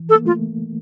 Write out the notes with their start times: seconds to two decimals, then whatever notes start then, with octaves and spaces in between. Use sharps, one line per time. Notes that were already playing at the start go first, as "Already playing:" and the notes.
Already playing: E3
0.09 A4
0.15 A#3
0.25 A3 F4